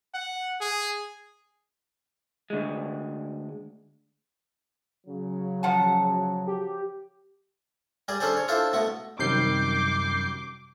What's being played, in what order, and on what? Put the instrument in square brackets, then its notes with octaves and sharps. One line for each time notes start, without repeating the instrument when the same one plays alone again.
[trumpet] F#5
G#4
[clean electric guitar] D2 G#3
[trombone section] C#3 F#3
[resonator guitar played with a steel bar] F3 F#5 A5
[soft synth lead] G4
[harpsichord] G3 G#4 D5
C#4 D4 G#4 A4 C5 D5
C#5
D4 E4 F4 A4 C5
B2 A3 B3 C#6
[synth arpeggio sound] F#2 G6 C7 [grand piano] C3 D#3 G3 [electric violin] D6